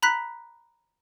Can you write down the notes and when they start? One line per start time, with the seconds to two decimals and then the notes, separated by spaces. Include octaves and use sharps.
0.03 A#5 B5 F#6 B6